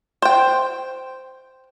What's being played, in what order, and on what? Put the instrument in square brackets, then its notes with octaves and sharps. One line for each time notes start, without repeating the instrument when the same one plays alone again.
[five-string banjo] C5 G5